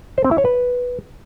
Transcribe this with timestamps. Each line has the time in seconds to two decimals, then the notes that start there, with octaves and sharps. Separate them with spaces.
0.18 C5
0.24 C4
0.31 E4
0.38 C#5
0.45 B4